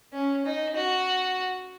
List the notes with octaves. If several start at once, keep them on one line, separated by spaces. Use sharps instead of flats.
C#4
D#4
F#4